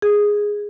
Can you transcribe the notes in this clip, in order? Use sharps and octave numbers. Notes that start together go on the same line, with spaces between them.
G#4